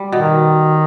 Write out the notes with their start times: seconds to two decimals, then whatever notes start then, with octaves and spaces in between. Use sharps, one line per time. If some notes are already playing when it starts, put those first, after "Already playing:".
Already playing: G3
0.12 B2 D#3